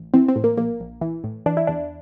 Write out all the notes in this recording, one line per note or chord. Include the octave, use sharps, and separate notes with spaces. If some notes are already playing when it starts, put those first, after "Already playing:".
Already playing: A1
E3 C4
C4
A2
A#3
A#1 A#3
A#1
E3
A2
E3 D4
E4
E2 D4